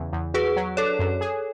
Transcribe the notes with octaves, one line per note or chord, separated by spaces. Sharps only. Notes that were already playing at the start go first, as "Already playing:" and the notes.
Already playing: E2 C#3
E2
F#4 G#4 B4
F#3
D4 A4 C#5
F#2
G#4